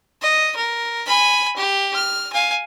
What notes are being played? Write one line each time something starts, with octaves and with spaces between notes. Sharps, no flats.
D#5
A#4
G#5 B5
G4
F6
F5 G#5